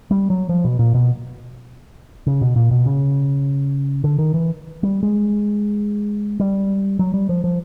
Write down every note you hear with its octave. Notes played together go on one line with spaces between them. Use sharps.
G3
F#3
F3
B2
A#2
B2
C#3
B2
A#2
B2
C#3
D3
D#3
E3
G3
G#3
G3
F#3
G3
F3
F3